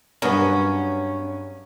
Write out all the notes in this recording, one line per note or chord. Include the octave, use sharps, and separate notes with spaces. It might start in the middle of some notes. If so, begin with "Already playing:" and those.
G2 F#3 B3 C#4 A#4